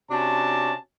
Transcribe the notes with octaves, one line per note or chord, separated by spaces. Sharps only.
C3 C#4 D4 F#4 A5